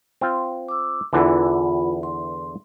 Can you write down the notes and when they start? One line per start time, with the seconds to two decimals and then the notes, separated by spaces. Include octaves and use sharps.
0.21 C4 F4
0.68 D6 E6
1.13 E2 D3 E3 F4 B5
2.03 C6